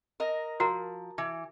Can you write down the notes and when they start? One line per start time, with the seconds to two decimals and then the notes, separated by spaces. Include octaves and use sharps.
0.20 A#4 D#5
0.60 F3 F#4 A#4 A#5
1.18 E3